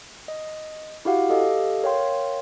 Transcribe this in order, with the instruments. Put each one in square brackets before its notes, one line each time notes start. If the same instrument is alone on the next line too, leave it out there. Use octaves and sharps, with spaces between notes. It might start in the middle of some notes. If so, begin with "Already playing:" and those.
[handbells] D#5
E4 F#4 G4 F5 F#5
G4 A4 D#5 F5
A#4 C#5 F5 G5 C6